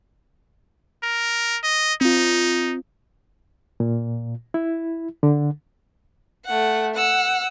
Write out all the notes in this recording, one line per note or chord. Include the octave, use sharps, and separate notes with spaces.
A#4
D#5
C4 D#4 F4
A#2
E4
D3
A3 F#5
F#5 E6